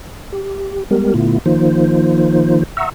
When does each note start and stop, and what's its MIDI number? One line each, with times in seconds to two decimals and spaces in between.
0.33 0.84 67
0.91 1.14 55
0.91 1.14 56
0.91 1.14 59
0.91 1.14 67
0.91 1.14 70
1.14 1.38 46
1.14 1.38 50
1.14 1.38 57
1.14 1.38 59
1.14 1.38 64
1.14 1.38 65
1.46 2.63 51
1.46 2.63 53
1.46 2.63 58
1.46 2.63 63
1.46 2.63 65
1.46 2.63 72
2.77 2.90 76
2.77 2.90 78
2.77 2.90 82
2.77 2.90 85
2.77 2.90 88